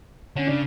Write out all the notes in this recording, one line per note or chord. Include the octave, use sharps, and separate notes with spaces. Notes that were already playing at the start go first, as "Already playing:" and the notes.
D3 C#4
C#3 D4